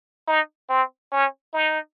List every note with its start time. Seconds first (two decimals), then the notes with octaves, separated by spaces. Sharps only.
0.28 D#4
0.69 C4
1.12 C#4
1.54 D#4